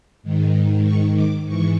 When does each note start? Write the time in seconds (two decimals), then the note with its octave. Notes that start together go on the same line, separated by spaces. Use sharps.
0.23 G#2 D#3
0.85 C#6
1.15 D6
1.46 G#2 E3 C#6